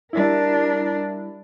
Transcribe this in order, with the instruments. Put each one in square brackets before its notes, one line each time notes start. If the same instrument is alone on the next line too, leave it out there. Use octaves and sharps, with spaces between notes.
[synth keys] G3 E4 [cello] D4 A#4